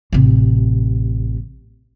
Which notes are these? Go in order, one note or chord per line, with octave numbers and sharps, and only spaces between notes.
A1 C3